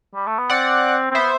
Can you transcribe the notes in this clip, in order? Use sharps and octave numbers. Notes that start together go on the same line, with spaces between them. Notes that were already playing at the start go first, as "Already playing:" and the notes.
G3
A3
B3
C4 D5 F#5
C4
B3 C5 E5